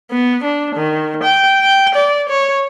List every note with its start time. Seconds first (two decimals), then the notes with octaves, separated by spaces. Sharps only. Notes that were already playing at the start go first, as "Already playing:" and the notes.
0.11 B3
0.44 D4
0.75 D#3
1.23 G5
1.61 G5
1.95 D5
2.29 C#5